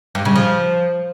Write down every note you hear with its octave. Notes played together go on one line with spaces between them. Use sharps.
G2
C#3
F3